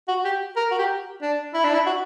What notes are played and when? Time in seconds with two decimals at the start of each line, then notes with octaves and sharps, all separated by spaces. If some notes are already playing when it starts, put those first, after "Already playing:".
0.08 F#4
0.25 G4
0.56 A#4
0.71 F#4
0.78 G4
1.22 D4
1.54 E4
1.64 D4
1.74 E4
1.86 F#4